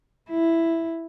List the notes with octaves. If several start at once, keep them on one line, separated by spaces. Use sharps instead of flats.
E4